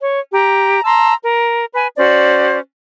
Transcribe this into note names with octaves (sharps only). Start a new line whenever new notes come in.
C#5
G4 A#5
A5 A#5 C6 E6
A#4
B4 G#5
C#4 F#4 C5 D5